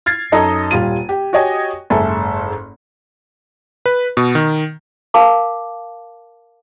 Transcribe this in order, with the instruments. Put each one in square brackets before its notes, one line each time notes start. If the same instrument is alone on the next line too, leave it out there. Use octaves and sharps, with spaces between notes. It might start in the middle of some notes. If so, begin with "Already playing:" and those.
[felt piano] F6 G#6 A6 C7
F#2 D#4 A4 D#5 A#5
D#1 G3 F4 D#7
G4
F#4 G4 C#5 D#5 G5 G#5
F#1 G#2 A4 E5 G#5
[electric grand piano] B4
B2
D#3
[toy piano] A#4 F5 A5 D6